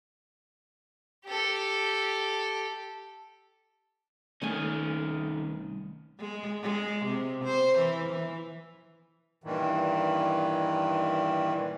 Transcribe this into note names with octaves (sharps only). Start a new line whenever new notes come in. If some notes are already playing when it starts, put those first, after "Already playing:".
G4 A4
C2 D#3 A3 C#4 G#5
G#3
G#3
C3
C5
E3
E3
G2 A#2 D#3 E3